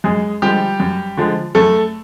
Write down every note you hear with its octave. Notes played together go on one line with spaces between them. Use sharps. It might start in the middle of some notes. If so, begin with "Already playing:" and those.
F#2 G#3 G#4
D3 F3 G3 G#3 G4
F#2
D3 F3 G#3
F#2 A3 A4